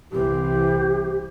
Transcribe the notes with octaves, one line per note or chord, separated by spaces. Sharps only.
C2 E3 C4 G4